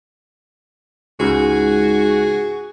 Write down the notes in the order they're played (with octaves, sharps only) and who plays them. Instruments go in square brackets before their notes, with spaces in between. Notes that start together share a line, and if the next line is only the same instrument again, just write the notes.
[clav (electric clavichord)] C#2 [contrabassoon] G#2 [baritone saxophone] F#4 [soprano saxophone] G#4